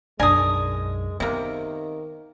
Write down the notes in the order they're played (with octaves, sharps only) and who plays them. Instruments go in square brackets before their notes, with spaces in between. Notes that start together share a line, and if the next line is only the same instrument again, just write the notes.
[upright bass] B1 F#2 [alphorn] G#3 [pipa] D4 G#5 [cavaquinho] A#4 D#6
[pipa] C3 A#3 [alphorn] D#3 [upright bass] B3